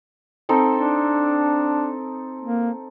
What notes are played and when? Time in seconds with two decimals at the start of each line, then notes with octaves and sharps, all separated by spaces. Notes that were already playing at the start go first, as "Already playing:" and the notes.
0.49 C4 D#4 A4
0.76 D4
2.41 A#3